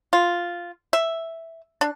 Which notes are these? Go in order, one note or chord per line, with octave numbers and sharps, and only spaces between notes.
F4
E5
D4